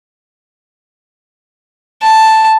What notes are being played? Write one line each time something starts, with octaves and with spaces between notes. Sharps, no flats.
A5